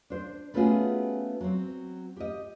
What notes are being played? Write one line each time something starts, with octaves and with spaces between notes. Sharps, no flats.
D4 C5
A3 B3 C#4 F4 F#4 G#4
F#3 C4
G4 D#5